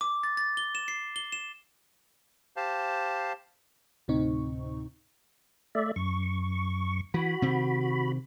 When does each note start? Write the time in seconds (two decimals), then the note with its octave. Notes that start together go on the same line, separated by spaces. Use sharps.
0.01 D6
0.23 A6
0.37 A6
0.57 G7
0.75 E7
0.88 C7
1.16 G7
1.32 E7
2.56 G4 C5 F5 A5
4.08 D2 A2 C3 C4 D#4 C#6
5.75 A3 D5 E5
5.96 F#2 C#6
7.14 E3 F#4 B5
7.42 C3 D#3 C4